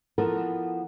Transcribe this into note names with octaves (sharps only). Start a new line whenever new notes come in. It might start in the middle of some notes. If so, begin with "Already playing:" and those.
E3 F3 B3 A4 A#4 F#5